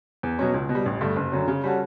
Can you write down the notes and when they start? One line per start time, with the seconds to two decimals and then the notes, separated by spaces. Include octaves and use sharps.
0.23 E2
0.39 B2 F#3 C#4
0.54 C#2
0.69 B2
0.75 G3
0.86 A1
1.01 G2 D3 A3
1.16 F#1
1.32 F#2 D3 F#3
1.48 C#3
1.64 G3 C#4 F#4 A4